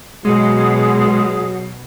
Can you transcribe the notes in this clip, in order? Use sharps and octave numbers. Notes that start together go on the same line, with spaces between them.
B2 F#3 G#3 G#4